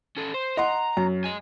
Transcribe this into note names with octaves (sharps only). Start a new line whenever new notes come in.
C#4 A4
C5
D#5 F#5 A#5 C6
F#2
D#5 G#5